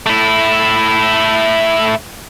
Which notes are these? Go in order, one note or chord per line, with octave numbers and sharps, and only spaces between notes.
A3 E4